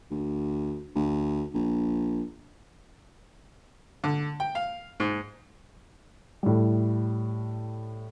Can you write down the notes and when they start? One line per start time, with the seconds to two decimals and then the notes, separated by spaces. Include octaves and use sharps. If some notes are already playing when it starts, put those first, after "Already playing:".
0.11 D2
0.95 D2
1.54 A#1
4.04 D3
4.40 G5
4.55 F5
5.00 G#2
6.43 A2 G3